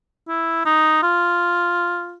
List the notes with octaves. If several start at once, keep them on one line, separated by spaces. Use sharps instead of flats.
E4
D#4
F4